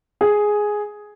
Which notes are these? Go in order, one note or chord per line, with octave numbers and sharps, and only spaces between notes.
G#4